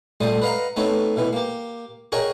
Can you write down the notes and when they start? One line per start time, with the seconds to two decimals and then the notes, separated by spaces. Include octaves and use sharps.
0.20 A#1 G3 A3 C5 D#6
0.42 B4 D#5 F5 F#5 A#5
0.76 A3 B3 C4 D#4 C#5
1.16 B2 E3 B3
1.33 A#3 G4
2.12 F#4 G#4 A#4 C#5 D#5 G5